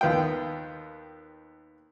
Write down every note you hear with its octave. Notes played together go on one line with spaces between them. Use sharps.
D#2 B3 F4 G5